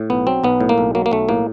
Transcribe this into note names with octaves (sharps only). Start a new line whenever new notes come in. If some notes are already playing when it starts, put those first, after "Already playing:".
Already playing: A2
B1 B3
F#3 C4
B1 B3
A2
A#3
B1
F#3 A#3
A#3
B1 A3
A2 A#3